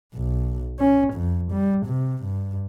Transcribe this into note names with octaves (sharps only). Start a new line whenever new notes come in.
B1
C#4
F2
G3
C3
G2